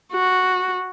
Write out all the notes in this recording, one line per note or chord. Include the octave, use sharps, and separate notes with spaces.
F#4